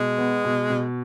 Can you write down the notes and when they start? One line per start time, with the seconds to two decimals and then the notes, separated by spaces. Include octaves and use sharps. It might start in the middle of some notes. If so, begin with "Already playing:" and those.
Already playing: B2 G#3
0.18 B3
0.45 B2
0.70 B2